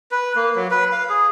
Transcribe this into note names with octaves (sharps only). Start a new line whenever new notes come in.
B4
A#3
F#3
B4
F5
G#4